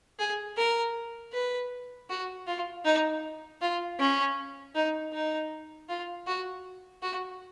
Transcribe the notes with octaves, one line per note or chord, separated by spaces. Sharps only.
G#4
A#4
B4
F#4
F4
D#4
F4
C#4
D#4
D#4
F4
F#4
F#4